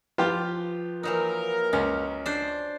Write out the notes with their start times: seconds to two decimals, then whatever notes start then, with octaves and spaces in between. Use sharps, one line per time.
0.18 F3 F4 G4 B4
1.03 E3 F#3 A#3 D#4 A#4
1.73 C#2 C#4
2.26 D4 C5